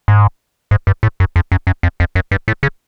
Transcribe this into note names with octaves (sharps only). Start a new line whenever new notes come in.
G#2
G#2
G2
A2
F#2
F2
F#2
F#2
F2
F2
F#2
G2
A2
C#3